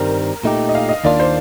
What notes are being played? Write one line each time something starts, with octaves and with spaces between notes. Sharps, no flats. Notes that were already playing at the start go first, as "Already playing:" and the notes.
Already playing: G2 D#3 G3 C4 A#4
A#2 A3 D#4 G4
D#5
F5
D#5
D#2 D#3 A#3 D4 F4 D5
C5